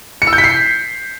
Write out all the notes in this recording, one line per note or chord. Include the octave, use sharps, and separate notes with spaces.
C#7
E6
G6
B6
C7